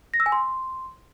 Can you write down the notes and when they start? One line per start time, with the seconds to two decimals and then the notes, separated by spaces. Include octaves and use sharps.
0.14 A#6
0.20 E6
0.26 G#5
0.32 C6